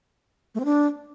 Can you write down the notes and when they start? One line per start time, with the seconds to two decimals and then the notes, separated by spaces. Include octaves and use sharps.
0.55 A3
0.60 C4
0.65 D4